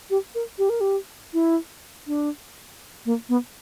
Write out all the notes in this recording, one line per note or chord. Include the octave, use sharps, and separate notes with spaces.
G4
A#4
G4
A#4
G4
E4
D4
A#3
B3